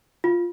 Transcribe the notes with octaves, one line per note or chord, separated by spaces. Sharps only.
F4